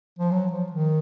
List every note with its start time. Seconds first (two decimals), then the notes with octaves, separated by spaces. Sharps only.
0.18 F3
0.31 F#3
0.51 F3
0.72 D#3